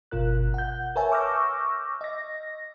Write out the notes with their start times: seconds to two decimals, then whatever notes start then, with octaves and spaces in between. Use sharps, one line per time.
0.11 G1 B2 F4 A#4 F#6
0.54 F#5 G6
0.96 A#4 B4 C#5 E5 G#5 A5
1.12 C#6 D6 E6 F6 G6 A#6
2.01 D#5 A#6